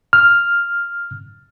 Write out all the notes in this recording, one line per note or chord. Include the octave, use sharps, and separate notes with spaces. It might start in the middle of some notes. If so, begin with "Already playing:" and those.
F6